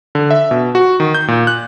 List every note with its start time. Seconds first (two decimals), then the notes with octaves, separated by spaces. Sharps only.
0.15 D3
0.31 E5
0.51 B2
0.75 F#4
1.00 D#3
1.14 G6
1.28 A#2
1.47 F#6